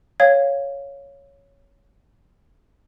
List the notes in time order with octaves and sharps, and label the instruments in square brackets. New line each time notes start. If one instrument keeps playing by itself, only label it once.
[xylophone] C#5 F5 G#6